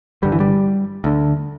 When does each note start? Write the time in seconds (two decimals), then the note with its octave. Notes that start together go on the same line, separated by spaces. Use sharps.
0.22 G1 G2 D3 G3
0.32 E3
0.40 G3
1.04 D2 D3